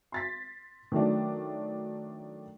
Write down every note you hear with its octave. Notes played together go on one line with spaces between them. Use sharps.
C6 A6 B6
D#3 F#3 A3 D4